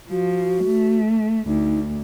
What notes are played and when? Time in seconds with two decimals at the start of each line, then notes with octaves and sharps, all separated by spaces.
0.10 F3 F#4
0.64 A3
1.47 D2 D#4